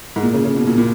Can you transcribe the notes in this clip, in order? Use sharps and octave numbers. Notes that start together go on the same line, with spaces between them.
G#2
A#2
C#3
C#3
B2
A#2
A#2